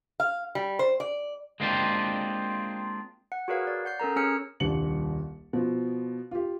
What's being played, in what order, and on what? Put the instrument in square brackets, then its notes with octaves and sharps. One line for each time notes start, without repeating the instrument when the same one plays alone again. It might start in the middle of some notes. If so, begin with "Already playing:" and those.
[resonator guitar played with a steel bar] F5
G3
C5
D5
[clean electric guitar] G#3 A#3 C4 D4 F4 G4
[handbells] F#5
F#4 G#4 A#4 B4 C#5 F5
D5
F#5 G6 C7
C#4 A4 A#4 A#5
C#4 G#4 C#5 E6 F6 C#7
[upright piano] D#1 C2 D4 C#7 F#7
B2 F3
F4 G4